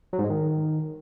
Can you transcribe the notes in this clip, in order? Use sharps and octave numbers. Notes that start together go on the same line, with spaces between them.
F#3
G#2
G#3
D#3